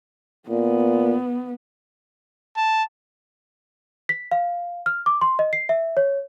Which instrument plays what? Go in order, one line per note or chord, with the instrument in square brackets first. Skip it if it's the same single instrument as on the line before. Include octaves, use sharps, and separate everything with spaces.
[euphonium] A#2 [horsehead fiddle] B3
[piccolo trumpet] A5
[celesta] B6
F5
F6
D6
C6
D#5
C7
E5
C#5